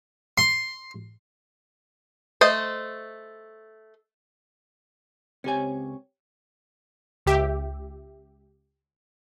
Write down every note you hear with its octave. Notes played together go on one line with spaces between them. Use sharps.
C6
A3 C5 D#5
C#2 C4 G4 C#5 G#5
C#2 G4 E5